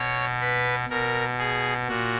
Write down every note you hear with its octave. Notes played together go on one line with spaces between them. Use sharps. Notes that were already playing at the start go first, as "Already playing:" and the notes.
Already playing: B2 C#5
B4
B2 A#4
G#4
A#2 F#4